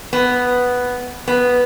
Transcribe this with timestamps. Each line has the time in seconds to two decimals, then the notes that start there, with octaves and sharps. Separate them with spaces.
0.13 B3
1.28 B3